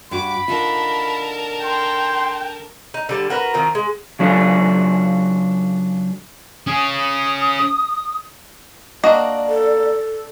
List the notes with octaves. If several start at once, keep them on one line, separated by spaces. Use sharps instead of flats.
G2 F#4 B5 D6
D3 D#4 F4 A#4 A5
G5 C6
D#4
D3 G3 A5
F#4 A#4 B4
D#3 F3 C4 A#4
G#3
C#3 F#3 D4 F4 A4
C#4 G#4 D#6
A#3 D4 F#4 D5 D#5
A4